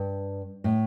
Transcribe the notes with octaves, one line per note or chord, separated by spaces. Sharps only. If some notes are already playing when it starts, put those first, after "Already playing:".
Already playing: G2
A2